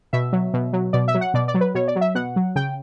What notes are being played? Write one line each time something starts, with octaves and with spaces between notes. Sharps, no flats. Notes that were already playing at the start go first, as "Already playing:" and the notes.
B2 E5
F#3
B2
F#3
B2 D5
E5
F#3
F#5
B2 D5
D5
F#3
B4
B2 C#5
D5
F#3
E5
B2 F#5
F#3
C#3 G5